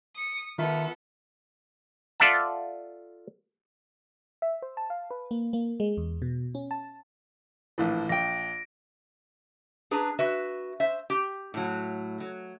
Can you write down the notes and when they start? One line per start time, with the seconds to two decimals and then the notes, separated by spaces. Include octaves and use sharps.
0.15 D#6 C#7
0.58 D#3 B3 F4 A4 E5
2.20 F4 A4 D5 E5 F#5 A5
4.42 E5
4.62 C5
4.77 A5
4.90 F5
5.11 B4
5.31 A#3
5.53 A#3
5.80 G#3
5.97 E2
6.22 B2
6.55 C#4
6.71 A5
7.78 A#1 A2 E3
8.09 A#1 G5 A#6 D7
9.91 D4 G#4 B4 A#5
10.19 F#4 B4 E5
10.80 C5 E5
11.10 G4
11.54 A2 F#3
12.20 F#3